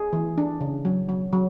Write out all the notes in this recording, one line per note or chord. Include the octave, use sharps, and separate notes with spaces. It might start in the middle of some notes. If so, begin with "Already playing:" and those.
Already playing: G#4
E3
D4
C#3
F#3
F#3
F#3